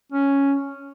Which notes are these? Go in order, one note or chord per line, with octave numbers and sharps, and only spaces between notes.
C#4